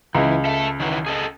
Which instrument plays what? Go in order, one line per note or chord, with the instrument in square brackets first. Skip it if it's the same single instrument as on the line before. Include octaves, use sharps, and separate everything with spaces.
[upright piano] C#2 [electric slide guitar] E3
[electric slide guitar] A4 E5
D#3 E3 F#3
G#4 A4 D#5